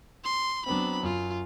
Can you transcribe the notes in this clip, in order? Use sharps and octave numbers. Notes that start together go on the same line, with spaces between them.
C6
F#3 B3 C4 D4 B5
F#2 F4